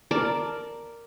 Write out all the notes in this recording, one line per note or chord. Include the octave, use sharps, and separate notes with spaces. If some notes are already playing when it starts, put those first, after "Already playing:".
A#4 D5 A5